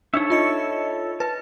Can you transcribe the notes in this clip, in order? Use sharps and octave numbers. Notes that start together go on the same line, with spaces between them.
D4 D#4 A4 C#5 E5
F4 D#5 C#7
B4 A5